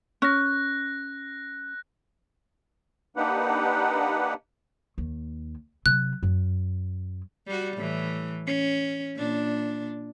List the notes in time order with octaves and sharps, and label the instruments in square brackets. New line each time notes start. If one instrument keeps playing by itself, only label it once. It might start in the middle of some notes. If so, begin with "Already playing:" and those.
[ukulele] C#4 [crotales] F#6 A#6
[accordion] A#3 D4 D#4 G4 B4 F#5
[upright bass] D#2
[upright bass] C3 F#3 [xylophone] F#6
[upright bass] F#2
[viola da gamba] G3 F#4
A2 E3
C#4
A#2 D4